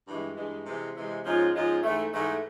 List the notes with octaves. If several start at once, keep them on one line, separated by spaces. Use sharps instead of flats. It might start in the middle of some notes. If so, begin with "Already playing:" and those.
G2 E3 G#3
G2 E3 G#3
C3 E3 G#3
C3 E3 G#3
G#2 F3 G#3 C#4 F4
G#2 F3 G#3 C#4 F4
G#2 E3 A3
G#2 E3 A3